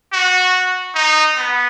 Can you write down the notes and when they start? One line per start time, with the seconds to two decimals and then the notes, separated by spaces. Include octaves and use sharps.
0.13 F#4
0.95 D#4
1.37 B3